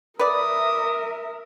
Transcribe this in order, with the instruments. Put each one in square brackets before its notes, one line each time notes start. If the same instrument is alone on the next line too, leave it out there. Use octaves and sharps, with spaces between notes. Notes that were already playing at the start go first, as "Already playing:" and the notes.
[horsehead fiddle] A#4 E5 [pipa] B4 D5 [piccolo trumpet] D#6